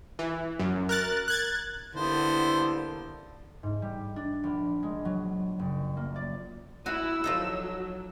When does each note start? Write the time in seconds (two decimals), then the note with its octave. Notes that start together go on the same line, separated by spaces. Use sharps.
0.19 E3
0.59 F#2
0.89 A#4 F#6 A6
1.28 F#6 G#6 A6
1.96 D3 G3 A#3 B3 E4 A4 C5
3.63 G#2
3.82 G3
4.16 D4
4.44 A#1
4.83 G#3
5.05 F#3
5.59 F#1
5.97 A#3
6.16 D5
6.86 E4 F#4 G#5 E6
7.24 F3 F#3 D#4 A4